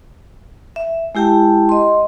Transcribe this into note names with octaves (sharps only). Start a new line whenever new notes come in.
E5
G#3 E4 G4 G5 A5
D#5 C6